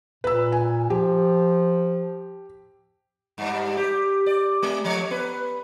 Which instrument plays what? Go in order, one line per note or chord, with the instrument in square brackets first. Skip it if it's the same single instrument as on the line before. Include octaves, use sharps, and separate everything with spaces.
[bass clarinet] A#2 [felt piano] B4 E6
[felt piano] G#5
[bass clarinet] F3 [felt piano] G4
[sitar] G2 G3
G4
D5
G#3
F3 A3 C#5
B3 B4